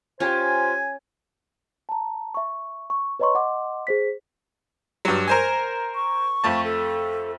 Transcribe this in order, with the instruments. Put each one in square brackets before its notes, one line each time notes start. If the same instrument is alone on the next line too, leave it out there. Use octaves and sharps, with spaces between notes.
[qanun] C#4 [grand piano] F4 G4 G5 [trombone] C5 [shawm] G#5
[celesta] A5 A#5
E5 C#6
C#6
B4 C#5 D#5 A#5 C6 C#6
D#5 F#5 C6 D6
G#4 C5 B6
[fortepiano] G2 F#3
A#4 C5 G#5
[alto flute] C#6
[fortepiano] F2 A3 A5
[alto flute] A4